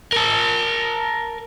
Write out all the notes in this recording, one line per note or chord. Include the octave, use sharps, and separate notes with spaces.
A#4 A5